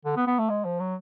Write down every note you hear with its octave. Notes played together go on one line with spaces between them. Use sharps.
D3
B3
B3
A3
G#3
F3
F#3